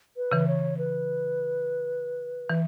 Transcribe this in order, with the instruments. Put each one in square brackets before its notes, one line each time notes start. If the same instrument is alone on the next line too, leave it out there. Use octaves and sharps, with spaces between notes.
[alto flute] B4
[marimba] C#3 E3
[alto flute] C#5
B4
[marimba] E3